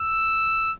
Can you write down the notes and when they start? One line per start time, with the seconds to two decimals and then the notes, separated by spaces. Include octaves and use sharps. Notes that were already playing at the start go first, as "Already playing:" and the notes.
Already playing: E6